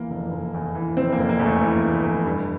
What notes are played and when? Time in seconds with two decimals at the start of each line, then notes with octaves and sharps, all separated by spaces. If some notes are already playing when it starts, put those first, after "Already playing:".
Already playing: E2 E3 A#3
0.10 F1
0.32 F1
0.54 E2
0.75 E3
0.97 F1 C4
1.12 A#3
1.18 F1
1.29 A#3
1.40 E2
1.45 A3
1.61 E3
1.83 F1
2.04 F1
2.25 G2